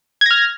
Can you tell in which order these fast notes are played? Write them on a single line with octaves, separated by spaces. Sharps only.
G#6 A#6 F6